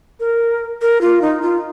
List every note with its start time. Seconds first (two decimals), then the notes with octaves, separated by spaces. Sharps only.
0.20 A#4
0.82 A#4
1.01 F4
1.22 D#4
1.42 F4